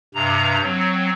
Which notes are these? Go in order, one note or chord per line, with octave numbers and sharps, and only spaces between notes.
G2 C3 A#5
F#3 C4